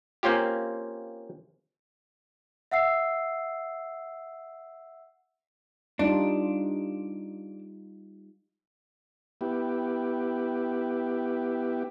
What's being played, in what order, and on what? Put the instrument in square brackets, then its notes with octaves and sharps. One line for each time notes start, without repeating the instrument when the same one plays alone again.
[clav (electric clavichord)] A#3 C4 C#4 F4 G4
[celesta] E5 F#5 E6 C7
[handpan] G3 D#4 F4 [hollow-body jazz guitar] D4
[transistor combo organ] B3 E4 G4